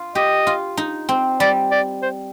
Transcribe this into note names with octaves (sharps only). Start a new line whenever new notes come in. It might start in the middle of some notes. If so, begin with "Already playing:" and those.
Already playing: F4
G4 D#5
F4
D#4
C4
G3 D5
D5
C5